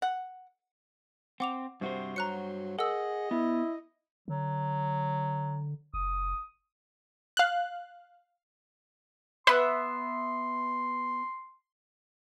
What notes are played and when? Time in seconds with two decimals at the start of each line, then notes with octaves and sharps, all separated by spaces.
0.02 F#5
1.40 C4 F#5 D6 F7
1.81 G2 C3 F#4 C5
2.16 F#3 A#5 F#6 C#7
2.79 G#4 A#4 D#5 F#5 E6
3.31 B3 E4
4.28 D3 F#3
5.94 F#1 D#6
7.37 F5 F#6
9.47 B3 B4 E5 C6 F#6